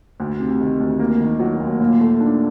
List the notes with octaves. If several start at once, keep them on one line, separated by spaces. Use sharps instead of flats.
D2
C3
D#3
D2
A#3
D#3
F#3
D#2
A#2
A3
D4